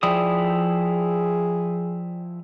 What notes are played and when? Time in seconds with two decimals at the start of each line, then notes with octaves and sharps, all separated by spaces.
0.03 F3 E4 G#4 D5 G5 D#6
0.53 G#4